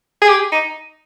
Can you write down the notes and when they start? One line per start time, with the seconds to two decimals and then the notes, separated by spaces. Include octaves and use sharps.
0.22 G#4
0.29 G4
0.52 D#4